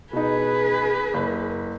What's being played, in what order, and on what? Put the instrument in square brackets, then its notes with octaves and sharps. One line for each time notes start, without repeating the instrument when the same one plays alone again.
[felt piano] B2 D#4 [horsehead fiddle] G#4 B4
[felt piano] F#1